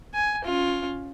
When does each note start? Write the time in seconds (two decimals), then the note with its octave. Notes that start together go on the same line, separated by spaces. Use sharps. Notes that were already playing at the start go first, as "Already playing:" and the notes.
0.14 G#5
0.44 C#4 F4